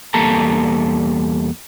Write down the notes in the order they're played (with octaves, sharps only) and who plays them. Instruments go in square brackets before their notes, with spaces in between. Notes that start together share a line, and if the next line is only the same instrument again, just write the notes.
[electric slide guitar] E2 G3 A#3 A4 A5 A#5